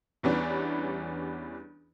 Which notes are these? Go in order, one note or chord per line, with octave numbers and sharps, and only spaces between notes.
E2 E3 G3 B3 C#4 D4